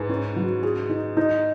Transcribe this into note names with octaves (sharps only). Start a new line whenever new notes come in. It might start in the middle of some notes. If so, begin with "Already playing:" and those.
Already playing: G#2 B4
C#4
F#3
G#4
D#4
D#4